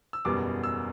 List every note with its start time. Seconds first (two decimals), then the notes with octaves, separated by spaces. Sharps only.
0.13 E6
0.25 F#1 E2 B2 G3 B3 D6
0.63 E6